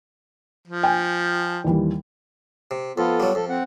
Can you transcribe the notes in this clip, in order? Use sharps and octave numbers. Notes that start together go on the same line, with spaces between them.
F3
G5 G#5
D#2 E3 G3
C3
F2 B3 F4 A4
F#3 G3
F2 A4
C4 F#5